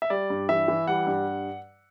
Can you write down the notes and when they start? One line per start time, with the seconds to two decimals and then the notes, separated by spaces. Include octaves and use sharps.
0.02 E5
0.10 G3 D5
0.30 G2
0.49 E3 E5
0.68 E3
0.87 G3 F#5
1.07 G2